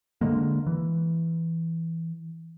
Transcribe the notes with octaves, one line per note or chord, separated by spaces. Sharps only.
D3 G#3 A#3
E3